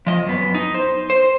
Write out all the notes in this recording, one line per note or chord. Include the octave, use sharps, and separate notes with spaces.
F3 D#5
F#2 B3
D#4
C5
C5